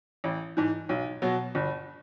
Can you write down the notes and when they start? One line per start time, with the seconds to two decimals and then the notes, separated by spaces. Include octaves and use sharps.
0.24 A1
0.57 G#2 E3
0.89 B1
1.22 B2 F#3
1.55 G1